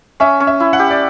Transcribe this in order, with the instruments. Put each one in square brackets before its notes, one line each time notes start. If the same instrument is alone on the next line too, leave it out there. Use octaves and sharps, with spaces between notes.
[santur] C#4 [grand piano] E5
[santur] C#4
[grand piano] E5
[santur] E4
[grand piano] F#5
[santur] G4
[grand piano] D5